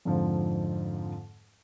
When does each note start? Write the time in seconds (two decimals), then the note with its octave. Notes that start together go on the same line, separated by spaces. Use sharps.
0.05 F2 G#2 D3 F3